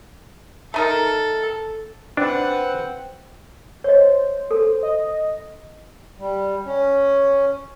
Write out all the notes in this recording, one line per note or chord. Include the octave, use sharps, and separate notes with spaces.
A3 D#4 A4 A#4
C4 D4 B4 F#5
C5 C#5 D#5
A4
D#5
G3
C#4